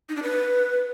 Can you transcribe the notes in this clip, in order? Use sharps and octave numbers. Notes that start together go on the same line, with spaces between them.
D#4
D4
B4